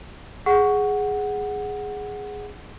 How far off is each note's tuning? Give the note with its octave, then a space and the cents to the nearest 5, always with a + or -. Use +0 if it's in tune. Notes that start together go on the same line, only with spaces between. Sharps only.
G#4 +0 F#5 +0